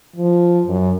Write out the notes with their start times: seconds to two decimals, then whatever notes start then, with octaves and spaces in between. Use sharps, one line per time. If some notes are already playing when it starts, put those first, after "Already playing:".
0.16 F3
0.67 F#2